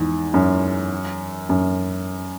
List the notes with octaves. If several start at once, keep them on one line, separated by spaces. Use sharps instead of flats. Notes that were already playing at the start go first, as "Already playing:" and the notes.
Already playing: E2 G#2
F#2
F#2